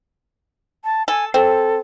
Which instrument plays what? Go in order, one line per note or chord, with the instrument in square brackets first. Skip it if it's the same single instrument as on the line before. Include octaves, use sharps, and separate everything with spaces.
[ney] A5
[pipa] A4 [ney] G#5
[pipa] C4 [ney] A4